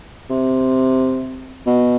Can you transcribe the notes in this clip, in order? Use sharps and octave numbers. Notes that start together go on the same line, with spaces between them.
C3
B2